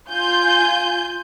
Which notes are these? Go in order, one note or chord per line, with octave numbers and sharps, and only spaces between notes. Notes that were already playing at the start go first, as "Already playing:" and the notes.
F4 G#5 G6